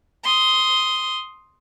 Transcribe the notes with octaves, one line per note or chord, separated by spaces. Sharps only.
C6 D#6